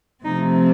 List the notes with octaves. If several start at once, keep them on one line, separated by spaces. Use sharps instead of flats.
C3 F3 A3 C4 D#4